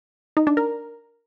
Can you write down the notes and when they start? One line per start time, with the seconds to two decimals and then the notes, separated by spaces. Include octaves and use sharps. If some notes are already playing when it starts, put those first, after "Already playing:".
0.37 D#4
0.47 D4
0.57 A#4